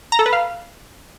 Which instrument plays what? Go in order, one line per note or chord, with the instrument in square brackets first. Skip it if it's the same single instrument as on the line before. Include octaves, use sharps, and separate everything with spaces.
[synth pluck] A#5
A4
B4
F5